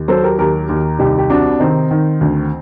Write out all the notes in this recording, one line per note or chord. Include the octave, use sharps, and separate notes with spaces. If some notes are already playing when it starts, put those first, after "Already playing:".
Already playing: D#2
F#3 A4 C5
G4 A#4
D#2 G4 A#4
D#2
C2 D#4 G4
G4
C3 D4 F#4
D#3 C4 D#4
D#3
D2